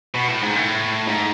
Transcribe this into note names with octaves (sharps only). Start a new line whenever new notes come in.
B2
A2
G#2
A2
G#2